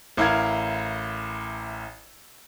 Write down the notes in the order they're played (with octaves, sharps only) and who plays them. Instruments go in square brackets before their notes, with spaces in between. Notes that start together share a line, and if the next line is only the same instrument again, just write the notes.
[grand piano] A1 E4 A#4 F5 G#6